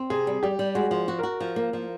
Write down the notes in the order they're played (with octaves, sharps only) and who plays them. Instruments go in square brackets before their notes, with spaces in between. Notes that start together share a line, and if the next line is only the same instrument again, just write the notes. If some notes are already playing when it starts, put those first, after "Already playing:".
Already playing: [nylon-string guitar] C4
[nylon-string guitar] C3 [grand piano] G#4
[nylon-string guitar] G3
[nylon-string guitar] G3 [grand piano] G4
[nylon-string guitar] G3
[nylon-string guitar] G#3 [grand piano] F#4
[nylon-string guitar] F3
F#4
[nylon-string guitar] F#4 [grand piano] A#4
[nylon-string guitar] F3
A#3
F3